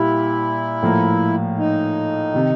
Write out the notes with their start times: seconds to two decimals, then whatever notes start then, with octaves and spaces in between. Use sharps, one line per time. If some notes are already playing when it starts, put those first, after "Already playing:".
Already playing: A#2 G3 A#3 E4 G4
0.82 A2 F3 A#3
1.58 D#4
2.34 C3 D#3